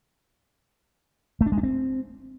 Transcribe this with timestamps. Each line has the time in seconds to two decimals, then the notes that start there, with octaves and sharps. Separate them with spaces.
1.41 A3
1.46 D4
1.52 G#3
1.58 D4
1.63 C4